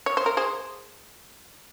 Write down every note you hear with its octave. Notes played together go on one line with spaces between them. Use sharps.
C#5
C5
A#4
G#4 C5